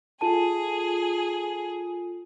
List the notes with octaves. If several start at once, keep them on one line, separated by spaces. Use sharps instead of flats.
F4 G#4 A4 G#5 A5 D#7